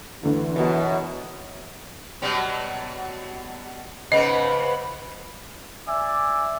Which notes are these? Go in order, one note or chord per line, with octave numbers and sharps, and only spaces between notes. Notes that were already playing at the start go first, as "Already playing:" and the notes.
D2 D3 E3
F#2 B2 B3 F#4
B2 F#3 G3
G#2 C#3 B3 B4 D#5 B5
D5 E5 G#5